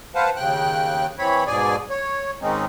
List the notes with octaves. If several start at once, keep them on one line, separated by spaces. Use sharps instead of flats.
B4 C5 F5 F#5 A5
D#2 C#3 G5 F#6
E3 C4 C#5 B5
G#2 B2 G#4 D5 G#5
C#5
G#2 D#3 G#3 C4 C#4 D#4